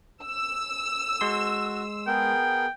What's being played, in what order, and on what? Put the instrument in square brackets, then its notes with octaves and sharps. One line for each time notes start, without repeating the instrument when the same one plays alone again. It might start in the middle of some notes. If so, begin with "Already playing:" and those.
[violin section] E6
[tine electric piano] G#3 C6 [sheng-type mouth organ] F#4
[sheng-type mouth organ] B3 G#4 A#4 [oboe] G5